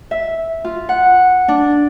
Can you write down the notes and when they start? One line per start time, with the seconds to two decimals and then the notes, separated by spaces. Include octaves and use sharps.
0.11 E5
0.65 F4
0.89 F#5
1.48 D4